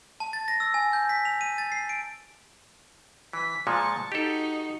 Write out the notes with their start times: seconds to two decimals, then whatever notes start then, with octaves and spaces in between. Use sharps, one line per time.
0.20 A5
0.33 A6
0.48 A#6
0.60 E6
0.74 G#5
0.93 G6
1.09 B6
1.25 F7
1.41 D#7
1.58 A6
1.72 C7
1.89 D7
3.33 E3 B6
3.67 A#2 F3 G#3 A5 C#6
4.12 D#4 F#4 G4 A4